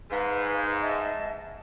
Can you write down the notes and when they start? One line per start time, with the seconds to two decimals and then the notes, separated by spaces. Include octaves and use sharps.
0.11 G#2 B4 F5
0.81 D#5 E5 A5